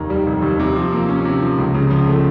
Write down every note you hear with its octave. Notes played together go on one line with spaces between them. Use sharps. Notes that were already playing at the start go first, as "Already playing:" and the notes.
Already playing: F1 D#2 D#3
G3
F1
D#2
C3
F3
A#3
C#4
C3
F3
C#2
C#3
F3
A3